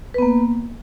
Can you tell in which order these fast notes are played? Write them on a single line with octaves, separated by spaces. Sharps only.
B4 B3 A#3